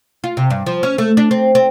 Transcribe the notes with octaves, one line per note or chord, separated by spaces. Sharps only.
F4
C3
G2
F3
C#4
A3
D4
C4
C4